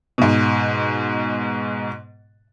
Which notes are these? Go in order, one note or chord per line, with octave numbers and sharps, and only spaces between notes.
G#2 B2